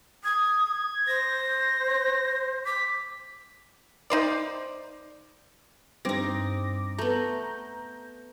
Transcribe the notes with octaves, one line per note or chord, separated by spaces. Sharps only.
D#6 G#6
C5 A#6
D6 B6
D#4 C5 D5
G2 C4 D#4 D6 A#6
A3 B3 A#5 G6